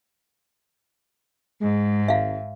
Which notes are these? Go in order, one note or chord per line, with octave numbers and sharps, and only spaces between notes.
G#2 G#3
G#1 E5 F5